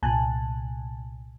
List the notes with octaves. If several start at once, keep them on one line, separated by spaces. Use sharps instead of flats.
C2 A#2 G#5 A5 F#6